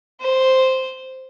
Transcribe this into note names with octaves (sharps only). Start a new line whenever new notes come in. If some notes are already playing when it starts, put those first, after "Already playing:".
C5